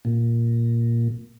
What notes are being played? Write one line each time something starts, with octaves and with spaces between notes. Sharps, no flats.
A#2